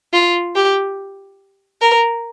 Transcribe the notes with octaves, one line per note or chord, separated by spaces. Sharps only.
F4
G4
A#4